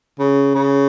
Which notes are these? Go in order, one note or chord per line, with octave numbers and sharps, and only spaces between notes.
C#3
C#3